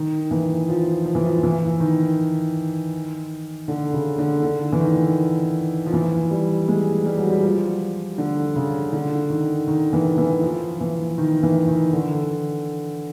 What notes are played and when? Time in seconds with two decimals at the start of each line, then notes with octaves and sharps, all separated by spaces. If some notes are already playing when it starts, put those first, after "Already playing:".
Already playing: D#3
0.31 E3
0.68 F3
1.06 F3
1.15 E3
1.24 F3
1.43 E3
1.80 D#3
3.68 D3
3.93 C#3
4.18 D3
4.43 D3
4.72 E3
4.81 D#3
5.86 F3
5.93 E3
6.31 G3
6.68 G#3
7.05 G3
7.18 F#3
7.29 G3
7.43 F3
8.18 D3
8.55 C#3
8.93 D3
9.30 D#3
9.68 D#3
9.93 E3
10.18 E3
10.43 F3
10.80 E3
11.18 D#3
11.43 E3
11.68 D#3
11.93 D3